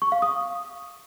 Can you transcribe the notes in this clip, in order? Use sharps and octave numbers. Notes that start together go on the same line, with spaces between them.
C#6
F5
D#6